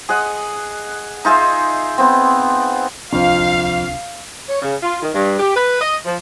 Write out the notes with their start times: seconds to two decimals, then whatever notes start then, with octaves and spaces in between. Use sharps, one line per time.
0.09 G#4 D#5 F#5
1.25 D#4 F4 G#4 E5
1.98 B3 C4
3.12 D1 C2 F2 D4 F5
4.49 C#5
4.62 C#3
4.83 F4
5.02 D#3
5.15 G2
5.40 G4
5.56 B4
5.81 D#5
6.05 F3